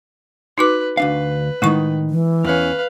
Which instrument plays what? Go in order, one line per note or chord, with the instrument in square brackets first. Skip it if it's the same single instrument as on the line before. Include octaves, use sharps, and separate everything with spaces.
[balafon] D#4 F#4 D6 [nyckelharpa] B4
[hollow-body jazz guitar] D2 D4 F5 [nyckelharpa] B4
[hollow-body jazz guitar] A2 D#3 D#4 [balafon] G#3 E4 C#6
[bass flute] E3
[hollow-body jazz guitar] E2 C#4 [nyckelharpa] B4 F5